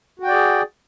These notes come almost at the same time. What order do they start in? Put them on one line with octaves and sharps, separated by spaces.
F#4 G5 D5 G#4